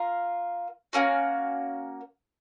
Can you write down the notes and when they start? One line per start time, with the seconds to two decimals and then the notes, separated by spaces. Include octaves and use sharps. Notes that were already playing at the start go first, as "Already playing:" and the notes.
Already playing: F4 A#4 F5
0.93 A#3 C#4 F#4